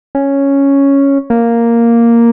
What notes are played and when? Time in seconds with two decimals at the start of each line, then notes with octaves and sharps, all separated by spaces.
0.15 C#4
1.30 A#3